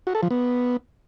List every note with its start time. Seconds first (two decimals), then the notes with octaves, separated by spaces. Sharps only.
0.07 F#4
0.15 A4
0.23 F3
0.31 B3